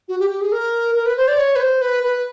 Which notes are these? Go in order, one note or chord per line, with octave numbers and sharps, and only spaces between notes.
F#4
G4
G4
G#4
A#4
A#4
B4
C5
D5
C#5
B4
C5
B4
B4